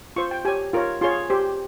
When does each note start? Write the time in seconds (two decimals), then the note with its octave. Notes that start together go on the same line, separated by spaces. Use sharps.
0.16 F4 C5 C#6
0.31 G5
0.45 G4 C#5 G#5
0.73 F4 A#4 C#5
1.01 F4 G#4 C#5 C6
1.30 G4 C5